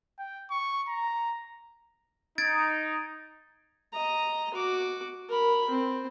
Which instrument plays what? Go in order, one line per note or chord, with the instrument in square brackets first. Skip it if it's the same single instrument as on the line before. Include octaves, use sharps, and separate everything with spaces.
[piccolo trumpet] G5
C#6
A#5
[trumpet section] D#4 [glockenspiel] G#6 A6 D7
[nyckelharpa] D#5 A#5
F#4 D6
A#4 B5
C4